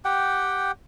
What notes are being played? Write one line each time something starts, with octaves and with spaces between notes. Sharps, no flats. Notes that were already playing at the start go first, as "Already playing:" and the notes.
G4 F#5 G5